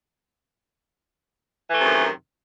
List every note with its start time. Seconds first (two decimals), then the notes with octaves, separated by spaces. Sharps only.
1.69 E3
1.73 A3
1.77 C3
1.81 D#3
1.85 F#2